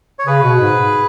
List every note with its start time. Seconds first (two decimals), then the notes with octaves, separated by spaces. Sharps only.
0.19 C#5
0.27 C#3 G#4 B4
0.43 B2
0.60 G#2